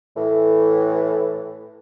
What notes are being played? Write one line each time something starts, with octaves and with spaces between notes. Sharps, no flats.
A2 E3